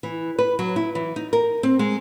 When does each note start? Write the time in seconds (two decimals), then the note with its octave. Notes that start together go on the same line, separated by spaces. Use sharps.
0.03 E3
0.39 B4
0.59 F#3
0.76 E4
0.95 E3
1.16 D#4
1.33 A#4
1.63 C4
1.79 G#3